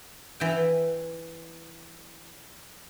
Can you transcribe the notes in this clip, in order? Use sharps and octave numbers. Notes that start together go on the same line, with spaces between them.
E3 G5